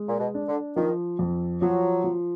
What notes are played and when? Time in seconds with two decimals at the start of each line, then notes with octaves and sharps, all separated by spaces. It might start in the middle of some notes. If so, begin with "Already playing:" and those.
Already playing: G#3
0.08 A#2
0.19 B2
0.34 D4
0.48 D3
0.76 D#3 F3
1.19 F2
1.62 F3 F#3
2.04 F3